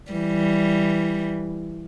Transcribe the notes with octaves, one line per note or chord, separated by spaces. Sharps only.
E3 G3